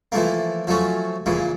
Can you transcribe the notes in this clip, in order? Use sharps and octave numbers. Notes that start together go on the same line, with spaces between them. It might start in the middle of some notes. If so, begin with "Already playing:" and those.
E3 F3 A3 A#3
F3 F#3 A3 C#4
A#2 C#3 E3